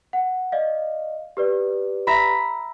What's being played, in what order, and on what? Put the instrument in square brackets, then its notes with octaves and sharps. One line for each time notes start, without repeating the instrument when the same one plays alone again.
[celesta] F#5
D5 D#5 F5
G4 B4 D5
[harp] E5 A#5 B5